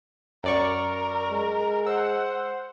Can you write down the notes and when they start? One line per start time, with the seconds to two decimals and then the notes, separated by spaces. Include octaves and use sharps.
0.44 F#2 A#4 D5 C#6
1.31 G#3
1.87 C5 F#5 E6